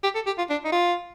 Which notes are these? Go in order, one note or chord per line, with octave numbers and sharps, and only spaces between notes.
G4
A4
G4
F4
D4
D#4
F4